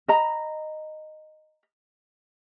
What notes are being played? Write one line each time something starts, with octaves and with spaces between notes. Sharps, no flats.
D#5 A#5 B5